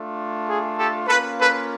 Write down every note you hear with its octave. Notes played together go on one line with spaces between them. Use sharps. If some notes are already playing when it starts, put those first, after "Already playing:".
Already playing: A3 D4 F4
G#4
G4 A4
A#3 C#4 F4 A4 B4
A4 B4